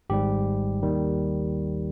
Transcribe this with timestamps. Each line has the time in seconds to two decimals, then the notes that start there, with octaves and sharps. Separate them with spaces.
0.10 G#1 G#2 G3 G4
0.83 D#2 D#3 G3